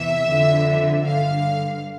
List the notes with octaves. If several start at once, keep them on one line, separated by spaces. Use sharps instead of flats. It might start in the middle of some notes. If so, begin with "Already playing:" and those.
Already playing: E2 C3 E3 E5
F2 D3
G2 D3 F5